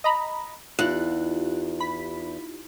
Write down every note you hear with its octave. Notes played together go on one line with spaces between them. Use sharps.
D#5 A#5 B5
E2 D#4 F4 G4 F#6
B5 B6